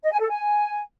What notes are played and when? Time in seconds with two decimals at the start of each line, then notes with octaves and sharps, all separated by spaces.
0.02 D#5
0.11 G#5
0.20 A4
0.30 G#5